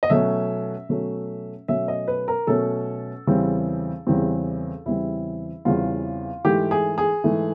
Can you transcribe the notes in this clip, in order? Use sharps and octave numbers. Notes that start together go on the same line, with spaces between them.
D#5
B2 F#3 A3 C#4 E5
B2 F#3 A3 C#4
B2 F#3 A3 C#4 E5
D#5
B4
A#4
B2 F#3 A3 C#4 A4
E2 C#3 E3 G3 C4
E2 C#3 E3 G3 C4
E2 C#3 E3 G3 C4 E4
E2 C#3 E3 G3 C4 F4
G#2 E3 A3 G4
G#4
G#4
G#2 E3 A3